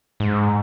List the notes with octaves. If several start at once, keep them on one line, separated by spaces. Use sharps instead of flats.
G#2